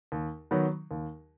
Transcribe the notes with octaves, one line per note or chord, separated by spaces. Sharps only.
D#2
D#3 F#3 B3
D#2